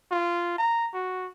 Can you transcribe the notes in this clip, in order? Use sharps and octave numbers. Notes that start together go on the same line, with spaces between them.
F4
A#5
F#4